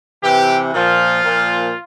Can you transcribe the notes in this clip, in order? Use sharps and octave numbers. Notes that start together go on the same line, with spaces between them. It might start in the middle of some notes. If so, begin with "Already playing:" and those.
C3 E3 G4
A#2 F3 F4
A#2 F3